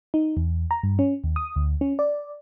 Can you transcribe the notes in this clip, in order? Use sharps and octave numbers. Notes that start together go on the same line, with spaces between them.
D#4
E2
A#5
G2
C#4
D#2
D#6
D2
C#4
D5